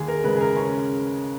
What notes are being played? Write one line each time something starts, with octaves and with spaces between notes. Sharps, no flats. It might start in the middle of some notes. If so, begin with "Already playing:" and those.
Already playing: D#2 G#4
A#4
C#3 G#3 B4
G#4
A#4
C#4